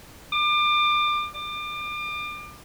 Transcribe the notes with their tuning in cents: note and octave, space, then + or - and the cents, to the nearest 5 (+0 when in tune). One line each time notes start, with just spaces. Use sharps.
D6 +30
D6 +35